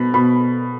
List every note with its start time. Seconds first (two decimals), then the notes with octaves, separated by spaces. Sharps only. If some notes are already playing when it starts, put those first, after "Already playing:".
Already playing: B2 B5
0.14 B2 B5